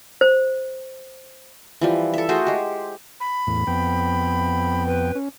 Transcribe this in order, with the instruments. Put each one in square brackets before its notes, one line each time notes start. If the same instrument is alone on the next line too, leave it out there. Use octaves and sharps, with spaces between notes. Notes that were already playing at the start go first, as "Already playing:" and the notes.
[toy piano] C5
[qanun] E3 F3 G3
A4 E5
A3 F#4 G#4 C5
G#3 G4
[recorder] B5
[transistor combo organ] E2 A2
F2 B3 G5
[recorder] B4
[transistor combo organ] C#4